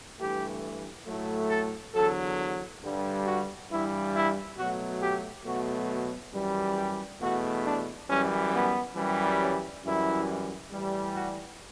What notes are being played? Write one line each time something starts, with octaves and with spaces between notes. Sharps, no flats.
G2 E3 A3 G4
A2 F#3 A3
A4
E2 D3 F#3 A4
G2 D3 G3
F#4
G2 E3 G3 E4
E4
B2 F#3 A3 F#4
G4
B2 F#3 A3 F#4
F#2 E3 G3
G4
E2 B2 A3 F#4
D4
F#2 E3 G3 C#4
B3
F#2 E3 G3
C#4
F#2 E3 G3 E4
A2 E3 G3
F#4